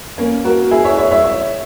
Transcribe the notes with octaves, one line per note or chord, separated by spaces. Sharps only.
A#3 C#4
F#4 A#4
E4 G#4
C#5 E5
C#5 E5
C#5 E5
C#5 E5